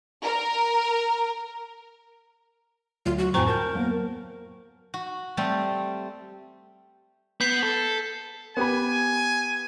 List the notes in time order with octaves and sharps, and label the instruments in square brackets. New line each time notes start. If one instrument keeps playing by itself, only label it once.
[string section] A#4
[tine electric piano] D2 F#3 [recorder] F4
[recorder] F#4
[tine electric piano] F2 A2 G#5 [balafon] C5 A#5 C#6 [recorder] G5
[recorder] A#4 [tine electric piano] A5 G6
[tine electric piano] F#3 A#3 B3
[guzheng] F#4
G3 A3 C4
[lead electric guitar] B3 [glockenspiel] G6 B6 C7
[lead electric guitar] A4
[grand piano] B3 G4 B5 [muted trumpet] G#5